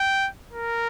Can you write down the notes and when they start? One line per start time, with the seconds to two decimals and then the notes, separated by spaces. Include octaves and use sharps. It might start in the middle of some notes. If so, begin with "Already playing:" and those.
Already playing: G5
0.52 A#4